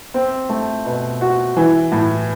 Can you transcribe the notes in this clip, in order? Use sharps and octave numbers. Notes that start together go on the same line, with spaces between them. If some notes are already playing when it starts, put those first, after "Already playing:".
C4
A3
B2
F#4
E3
A2